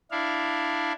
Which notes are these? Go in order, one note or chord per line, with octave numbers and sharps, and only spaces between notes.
D4 E4 F5